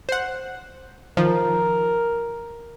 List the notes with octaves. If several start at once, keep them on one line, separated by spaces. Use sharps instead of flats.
C5 F#5
D#3 F3 A#4